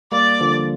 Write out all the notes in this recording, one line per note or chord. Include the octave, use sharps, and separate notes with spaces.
G3 A#3 D5
D3 F3